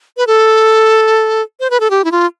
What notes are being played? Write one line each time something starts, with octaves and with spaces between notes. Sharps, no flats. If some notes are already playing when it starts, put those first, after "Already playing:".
B4
A4
C5
B4
A4
G4
E4
F4